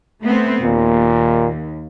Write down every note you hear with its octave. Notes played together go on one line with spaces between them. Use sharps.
A3 B3 C4
D#2 A#2